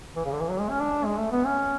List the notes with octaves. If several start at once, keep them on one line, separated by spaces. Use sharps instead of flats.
E3
C#3
D3
E3
F#3
G#3
C#4
D4
G#3
A3
B3
C#4